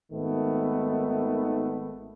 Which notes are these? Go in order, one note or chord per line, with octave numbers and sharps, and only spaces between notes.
G#1 D#3 A3 B3